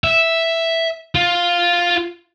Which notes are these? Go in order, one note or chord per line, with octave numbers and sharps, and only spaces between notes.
E5
F4